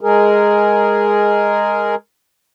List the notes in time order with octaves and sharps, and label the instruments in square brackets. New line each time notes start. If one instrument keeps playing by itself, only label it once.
[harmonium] G#3 G#4 A#4